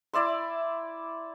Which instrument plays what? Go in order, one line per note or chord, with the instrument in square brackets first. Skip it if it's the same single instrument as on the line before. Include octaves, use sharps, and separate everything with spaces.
[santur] E4 D5 E5 C6